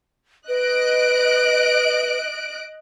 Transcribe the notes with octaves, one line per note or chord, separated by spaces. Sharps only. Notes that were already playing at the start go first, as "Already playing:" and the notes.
B4 D#5 F#6 D7